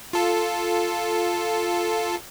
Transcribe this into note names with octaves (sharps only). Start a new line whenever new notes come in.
F4 A4